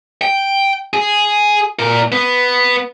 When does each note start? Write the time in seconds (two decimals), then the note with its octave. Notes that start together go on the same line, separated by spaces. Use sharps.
0.21 G5
0.94 G#4
1.79 A#2 A#4
2.12 B3